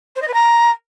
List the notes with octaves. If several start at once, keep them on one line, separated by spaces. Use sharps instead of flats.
C5
D#5
B4
A#5